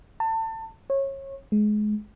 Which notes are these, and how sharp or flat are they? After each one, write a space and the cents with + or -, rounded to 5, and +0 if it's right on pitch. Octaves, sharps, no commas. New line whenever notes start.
A5 +30
C#5 -25
G#3 +25